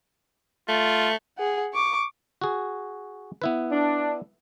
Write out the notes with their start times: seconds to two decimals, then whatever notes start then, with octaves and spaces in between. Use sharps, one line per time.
0.69 A3 F4
1.38 G#4 F#5
1.73 C#6 D6
2.41 F#4 G#4
3.42 B3 E4 B4
3.72 D4